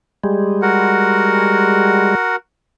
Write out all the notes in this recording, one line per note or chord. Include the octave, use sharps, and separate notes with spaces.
G3 G#3
F#4 A#4 F#5